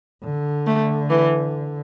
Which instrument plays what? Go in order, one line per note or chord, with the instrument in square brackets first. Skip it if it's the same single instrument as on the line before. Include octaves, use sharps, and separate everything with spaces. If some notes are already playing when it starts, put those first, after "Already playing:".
[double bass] D3
[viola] A3
E3